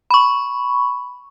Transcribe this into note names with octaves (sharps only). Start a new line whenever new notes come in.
B5 C#6